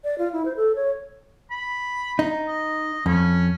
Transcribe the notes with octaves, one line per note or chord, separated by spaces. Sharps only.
D5
F4
E4
C5
A4
C#5
B5
D#4
D#5
F2 C#4